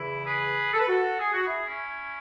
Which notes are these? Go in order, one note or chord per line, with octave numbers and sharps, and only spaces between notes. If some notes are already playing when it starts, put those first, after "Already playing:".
Already playing: E2 C#3 E3 E4
G#4 B4
A4
B4
F#4 A4
G#4
F#4
E4 G#4
C#4 E4